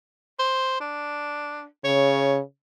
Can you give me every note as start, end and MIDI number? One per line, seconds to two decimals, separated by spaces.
0.39 0.79 72
0.81 1.65 62
1.84 2.41 49
1.84 2.38 73